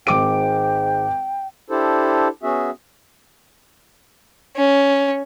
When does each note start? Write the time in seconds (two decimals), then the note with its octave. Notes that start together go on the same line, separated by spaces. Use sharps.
0.07 G#1 G#2 G5 D6 D7
1.70 D4 E4 G4 A4 C5
2.43 B3 C#4 F#4 G#4 E5
4.56 C#4